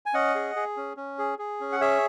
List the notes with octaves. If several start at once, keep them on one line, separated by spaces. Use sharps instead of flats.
G#5
C#4 D#5 F#5
G#4
G#4
C#4
C#4
G#4
G#4
C#4
F#5
G#4 C#5 E5